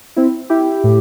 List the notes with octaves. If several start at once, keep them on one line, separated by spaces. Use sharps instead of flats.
C4 E4
E4 G4
A2